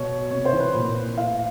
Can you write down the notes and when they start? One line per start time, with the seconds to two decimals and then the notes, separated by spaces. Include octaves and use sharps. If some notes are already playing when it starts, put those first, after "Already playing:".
Already playing: B2 C#5
0.30 C3 C#5
0.45 C5
0.53 E3
0.59 B4
0.74 A#2
1.17 A2 F5